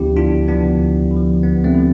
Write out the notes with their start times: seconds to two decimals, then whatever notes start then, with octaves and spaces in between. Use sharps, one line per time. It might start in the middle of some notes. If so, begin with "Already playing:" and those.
Already playing: D2 D3 F3 B3 D4 E4 G4
0.16 D2 D4 F4
0.48 D3 F3 B3 D4
0.80 D2
1.11 D3
1.16 F3
1.43 D2 B3
1.64 A3 C4
1.75 D3 F3